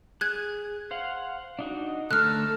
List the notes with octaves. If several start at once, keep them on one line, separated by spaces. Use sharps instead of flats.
G#4 F#6 G#6
C5 F5 F#5
D4 D#4 F#4
D3 A3 A4 A#5 F6 F#6